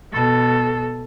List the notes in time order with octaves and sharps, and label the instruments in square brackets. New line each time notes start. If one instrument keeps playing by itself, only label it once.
[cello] B2 A4